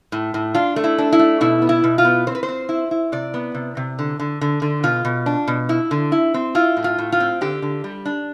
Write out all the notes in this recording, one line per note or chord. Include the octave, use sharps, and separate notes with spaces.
A2
A2
D4 F4
A3
E4
D4
E4
A3
B2 E4
B3
E4
B2
F4
B3
C4 C5
B4
C5
C4
E4
E4
C3 D5
B3
C3
C3
D3
D3
D3
D3
B2 F4
B2
D4
B2
E4
D3
E4
C4
E4 F4
A2
F4
A2
F4
C4
D3 G4
D3
G3
D4